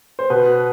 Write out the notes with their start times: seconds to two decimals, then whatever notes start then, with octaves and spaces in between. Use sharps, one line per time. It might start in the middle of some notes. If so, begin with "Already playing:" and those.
0.19 C5
0.30 B2 B4